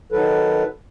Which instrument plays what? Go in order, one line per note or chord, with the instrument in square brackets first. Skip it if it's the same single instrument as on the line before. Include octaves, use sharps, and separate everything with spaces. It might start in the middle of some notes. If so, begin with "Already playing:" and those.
[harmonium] D#3 F#3 A4 B4